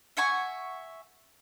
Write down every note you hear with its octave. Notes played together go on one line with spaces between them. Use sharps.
E5 F#5 G#5 C#6